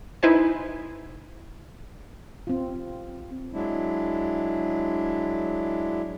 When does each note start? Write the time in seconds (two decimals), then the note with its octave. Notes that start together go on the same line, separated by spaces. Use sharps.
0.23 D#4 E4 B4 C5 G#5
2.47 C4 F4
3.53 F#3 G#3 D4 E4